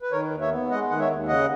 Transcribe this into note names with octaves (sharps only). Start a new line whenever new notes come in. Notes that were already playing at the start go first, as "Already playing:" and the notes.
B4
D#3 A#4 C#5
D#2
C#5 E5
B3
G#3 D#5 F#5
D#3 F#5
C#5 E5
D#2
C#3 D#5 F#5